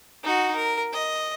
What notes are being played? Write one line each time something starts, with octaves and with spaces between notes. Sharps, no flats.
D#4 F#4
A#4
D#5